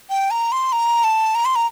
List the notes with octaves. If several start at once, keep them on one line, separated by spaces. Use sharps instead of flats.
G5
A#5
C6
A#5
A5
A#5
C6
A#5